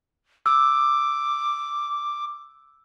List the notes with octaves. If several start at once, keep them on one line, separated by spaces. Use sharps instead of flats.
D6 E6